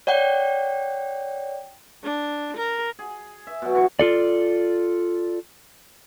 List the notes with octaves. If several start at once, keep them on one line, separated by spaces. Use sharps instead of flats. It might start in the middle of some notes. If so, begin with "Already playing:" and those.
C#5 D5 F#5 G5
D4
A#4
G#4
E5
B2 F#3
E3 C#6
F4 A4 D5